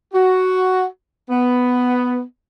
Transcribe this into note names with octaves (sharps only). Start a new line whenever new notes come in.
F#4
B3